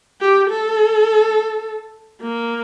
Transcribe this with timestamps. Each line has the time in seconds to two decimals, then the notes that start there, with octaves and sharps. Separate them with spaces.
0.21 G4
0.50 A4
2.22 A#3